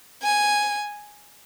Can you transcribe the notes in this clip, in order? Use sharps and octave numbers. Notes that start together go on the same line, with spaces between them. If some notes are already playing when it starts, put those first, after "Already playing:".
G#5